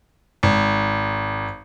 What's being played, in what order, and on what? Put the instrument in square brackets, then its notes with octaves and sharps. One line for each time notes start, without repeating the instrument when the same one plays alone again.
[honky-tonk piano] G#1